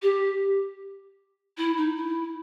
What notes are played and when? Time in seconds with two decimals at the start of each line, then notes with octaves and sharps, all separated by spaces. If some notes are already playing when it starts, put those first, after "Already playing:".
0.02 G4
1.57 E4
1.77 D#4
1.96 E4